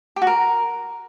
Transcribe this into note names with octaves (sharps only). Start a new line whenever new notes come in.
G4
F#4
A#4